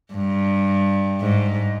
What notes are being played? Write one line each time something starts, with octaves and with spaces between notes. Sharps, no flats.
G2
G#2